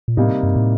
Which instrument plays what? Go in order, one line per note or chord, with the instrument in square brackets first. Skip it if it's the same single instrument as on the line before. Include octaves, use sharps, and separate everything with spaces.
[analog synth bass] A#2
[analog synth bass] A2 [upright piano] C3 G3 A#3 D#4
[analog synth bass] G2
A2